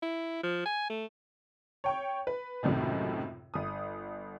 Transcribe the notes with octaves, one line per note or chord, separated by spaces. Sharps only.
E4
F3
G#5
A3
C#5 G5 C#6
B4
C#2 F#2 A2 C3 D#3
G1 D#6